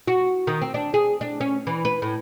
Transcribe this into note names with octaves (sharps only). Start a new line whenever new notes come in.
F#4
D#3
C4
D4
G#4
D4
C#4
E3
B4
A2